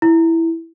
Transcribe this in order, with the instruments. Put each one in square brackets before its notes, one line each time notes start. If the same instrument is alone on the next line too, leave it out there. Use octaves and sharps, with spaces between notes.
[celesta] E4